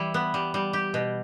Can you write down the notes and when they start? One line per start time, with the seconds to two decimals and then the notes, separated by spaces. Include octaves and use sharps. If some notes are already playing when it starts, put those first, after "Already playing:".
Already playing: E3 G3 E4
0.14 B3
0.34 G3
0.54 G3
0.73 G4
0.94 B2